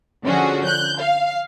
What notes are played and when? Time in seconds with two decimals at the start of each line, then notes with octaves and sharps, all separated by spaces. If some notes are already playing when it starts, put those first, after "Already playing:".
0.24 D3 F3 C#4 F#4 G#4
0.65 F#6 G6
1.00 F5